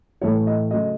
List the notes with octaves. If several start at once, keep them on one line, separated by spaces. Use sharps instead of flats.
A2 E3 A3 C#5
D#5
C#3 F#3 A3 D#5